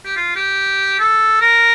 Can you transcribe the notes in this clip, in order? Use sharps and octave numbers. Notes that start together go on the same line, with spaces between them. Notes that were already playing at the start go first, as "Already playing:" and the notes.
G4
F4
G4
A4
A#4